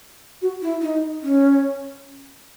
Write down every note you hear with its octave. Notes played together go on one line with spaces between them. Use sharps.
F#4
E4
D#4
C#4